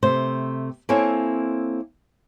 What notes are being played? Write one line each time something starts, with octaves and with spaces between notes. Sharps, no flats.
C3 A3 C5
A#3 C4 E4 A4 C#5 G#5